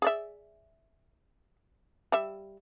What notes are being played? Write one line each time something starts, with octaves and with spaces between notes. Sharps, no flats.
G#4 D5 E5
G3 E5